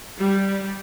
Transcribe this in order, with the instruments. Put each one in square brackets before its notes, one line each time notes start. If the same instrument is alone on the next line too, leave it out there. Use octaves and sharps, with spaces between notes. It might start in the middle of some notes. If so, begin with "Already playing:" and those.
[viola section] G3